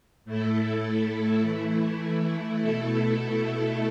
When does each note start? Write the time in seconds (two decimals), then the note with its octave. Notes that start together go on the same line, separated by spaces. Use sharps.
0.25 A2 A3 E4 A4
1.42 E3 A3 E4
2.59 B2 A3 E4 A4